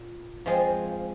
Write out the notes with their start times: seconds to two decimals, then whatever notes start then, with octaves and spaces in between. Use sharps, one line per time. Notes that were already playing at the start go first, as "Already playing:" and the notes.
Already playing: A#2
0.46 F3 G#3 C4 F4